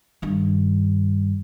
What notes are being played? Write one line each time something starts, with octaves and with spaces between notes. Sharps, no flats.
G2 D#3